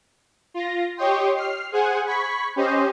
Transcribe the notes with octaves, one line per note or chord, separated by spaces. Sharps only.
F4 A#6
G4 C#5 D#5 G5 C6
F6 C7
G#4 C5 F#5 G#5
B5 C#6 G#6 B6
C#4 G4 C5 D#5